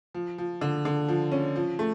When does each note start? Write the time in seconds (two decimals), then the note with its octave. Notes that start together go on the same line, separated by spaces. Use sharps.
0.14 F3
0.38 F3
0.61 D3
0.85 D3
1.08 F3
1.32 C#4
1.56 F3
1.79 A3